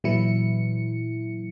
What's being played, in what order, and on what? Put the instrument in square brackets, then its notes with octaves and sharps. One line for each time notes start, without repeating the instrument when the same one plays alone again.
[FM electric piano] A#2 E3 F#3 E4 C#7